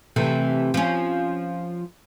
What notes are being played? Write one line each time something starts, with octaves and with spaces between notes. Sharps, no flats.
C3 E3 A3
F3 C#4